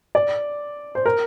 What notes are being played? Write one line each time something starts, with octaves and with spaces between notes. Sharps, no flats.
D5
C5
A#4